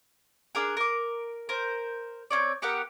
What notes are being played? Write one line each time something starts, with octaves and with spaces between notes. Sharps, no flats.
D4 G#4 A#4
A#4 D6
A#4 C5
C4 C#4 C#5 D5
B3 G4 A#4 F#5